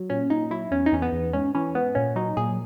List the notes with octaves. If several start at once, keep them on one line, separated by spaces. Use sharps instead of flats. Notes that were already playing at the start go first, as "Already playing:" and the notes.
Already playing: F#3
A#2 C#4
A#2 D#4
F#3 E4
E2 C#4
D#4
E2 C#4
B3
E2
G#2 C#4
E3 C#4
G#2 B3
A#2 C#4
F#3 D#4
A#2 G#4